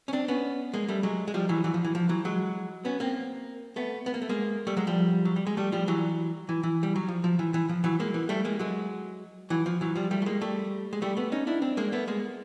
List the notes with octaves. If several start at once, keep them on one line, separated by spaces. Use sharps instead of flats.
C#4
C4 D4
B3 C#4
G#3 A#3
G3 A3
F#3 G#3
G#3
F3 G3
E3 F#3
E3 F#3
F3
E3
F3
E3 F#3
F#3 G#3
B3 C#4
A#3 C4
A3 B3
B3
A#3
A3
G#3 A#3
G3 A3
F#3 G#3
F3 G3
F#3
G3
G#3
G3 A3
F3 G3
E3 F#3
E3
E3
G3
F#3
F3
F3
E3
E3
F3
E3 F#3
G#3 A#3
E3
G3 A3
G#3 A#3
F#3 G#3
E3 F#3
F3
E3 F#3
F3 G3
G3 A3
A3
G#3 A#3
G3 A3
G#3
G3 A3
A3 B3
C#4 D#4
D4 E4
C4 D4
G#3 A#3
A3 B3
G#3 A#3